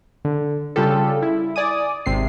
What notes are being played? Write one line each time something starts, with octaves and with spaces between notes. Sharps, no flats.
D3
C#3 G3 F4 G4 A4
E4
D5 G#5 D#6
G#1 C3 C7